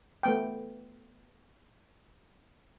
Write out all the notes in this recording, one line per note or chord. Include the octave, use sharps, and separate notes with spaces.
A3 B3 G5